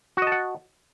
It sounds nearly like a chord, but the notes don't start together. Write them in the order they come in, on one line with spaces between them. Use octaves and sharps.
F#4 D#5 A5 F#5